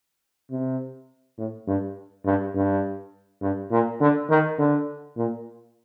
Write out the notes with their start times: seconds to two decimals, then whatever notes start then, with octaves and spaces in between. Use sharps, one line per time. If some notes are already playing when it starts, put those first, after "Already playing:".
0.51 C3
1.38 A2
1.67 G2
2.25 G2
2.55 G2
3.42 G2
3.71 A#2
4.01 D3
4.30 D#3
4.58 D3
5.17 A#2